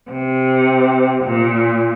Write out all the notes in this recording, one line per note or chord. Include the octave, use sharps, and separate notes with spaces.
C3
A#2